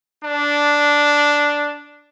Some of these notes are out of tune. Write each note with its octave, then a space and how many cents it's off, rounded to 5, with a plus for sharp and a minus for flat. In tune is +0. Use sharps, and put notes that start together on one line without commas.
D4 -5